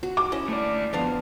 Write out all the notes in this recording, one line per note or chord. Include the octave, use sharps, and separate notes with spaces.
F#4
D6
C#4 E4 D#5
A3 D5
F2 B3 D4 F5